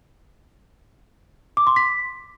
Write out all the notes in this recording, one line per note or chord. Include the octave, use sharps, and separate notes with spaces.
D6
C6
B6